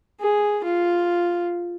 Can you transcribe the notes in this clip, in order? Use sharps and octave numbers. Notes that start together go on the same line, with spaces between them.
G#4
F4